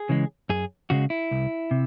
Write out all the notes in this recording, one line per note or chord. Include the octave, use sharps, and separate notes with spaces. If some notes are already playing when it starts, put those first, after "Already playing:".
Already playing: G#4
C#3 E3 G#3
F#2 G#4
C#3 G#3 F#4
E4
C2
C3